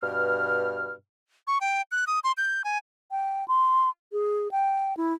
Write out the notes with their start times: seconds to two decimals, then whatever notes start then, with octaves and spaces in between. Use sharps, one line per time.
0.03 G2 B2 F6
1.47 C#6
1.61 G5
1.91 F#6
2.07 D#6
2.24 C6
2.37 G6
2.64 G#5
3.11 G5
3.48 C6
4.12 G#4
4.52 G5
4.97 E4